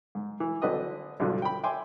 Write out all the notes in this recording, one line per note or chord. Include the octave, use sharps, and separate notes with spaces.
G#2
E3
G#1 D3 C4 B4 D#5 D#6
B1 G2 D3 F3 F#3
G5 B5
E5 G5 G#5 C6 D6